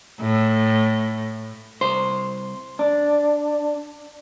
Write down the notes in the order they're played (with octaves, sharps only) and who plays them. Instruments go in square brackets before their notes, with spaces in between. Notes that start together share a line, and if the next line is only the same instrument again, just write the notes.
[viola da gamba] A2
[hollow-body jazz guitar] C2 C5
[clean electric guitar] D4